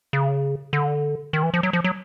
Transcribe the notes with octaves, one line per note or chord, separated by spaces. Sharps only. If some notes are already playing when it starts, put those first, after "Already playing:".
C#3
D3
D#3
E3
F3
F#3
F3
F#3